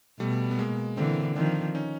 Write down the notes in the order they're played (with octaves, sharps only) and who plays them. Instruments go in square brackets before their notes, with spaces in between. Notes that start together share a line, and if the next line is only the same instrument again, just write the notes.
[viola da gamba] B2 [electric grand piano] G3 A3
[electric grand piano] B3
G#3 A#3
[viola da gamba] D3 E3 [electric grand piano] A#3 C4
[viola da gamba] D#3 F3 [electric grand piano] C4 D4
[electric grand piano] C#4 D#4